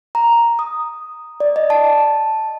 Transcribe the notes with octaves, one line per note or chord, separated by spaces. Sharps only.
A#5
D#6
D5
D#5
A5